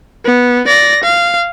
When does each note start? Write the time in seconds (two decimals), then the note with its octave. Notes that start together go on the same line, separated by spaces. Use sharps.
0.24 B3
0.67 D5 A#6
1.03 F5